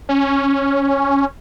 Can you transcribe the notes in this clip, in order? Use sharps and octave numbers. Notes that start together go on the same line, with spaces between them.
C#4